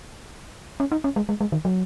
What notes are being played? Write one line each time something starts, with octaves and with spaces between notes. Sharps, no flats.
C#4
D#4
C#4
G#3
G#3
G#3
D#3
F#3